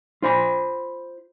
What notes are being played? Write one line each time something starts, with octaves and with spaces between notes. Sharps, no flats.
F4 C5 B5